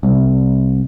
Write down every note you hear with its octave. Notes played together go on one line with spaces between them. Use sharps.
C2